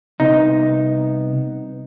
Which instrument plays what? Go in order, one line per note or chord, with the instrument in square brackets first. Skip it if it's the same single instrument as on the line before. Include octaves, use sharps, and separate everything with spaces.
[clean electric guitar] C2 C3 B3 [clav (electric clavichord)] D#4